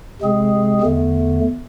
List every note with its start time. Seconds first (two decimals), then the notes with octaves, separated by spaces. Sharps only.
0.21 C3 G#3 C4 G#4
0.81 E2 D3 A3